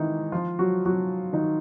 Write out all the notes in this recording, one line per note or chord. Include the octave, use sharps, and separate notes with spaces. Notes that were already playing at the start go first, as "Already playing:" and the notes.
Already playing: G#2 D#3 E3 D#4 E4
F3 F4
F#3 F#4
F#3 F#4
D#3 D#4